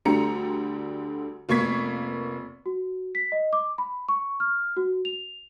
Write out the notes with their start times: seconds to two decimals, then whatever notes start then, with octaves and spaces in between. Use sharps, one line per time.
0.05 D2 D3 G3 G4 A#5 C#7
1.49 F1 A#3 B3 C#6 G#6 B6
2.66 F#4
3.15 B6
3.32 D#5
3.53 D6
3.78 B5
4.09 C#6
4.40 F6
4.77 F#4
5.05 F7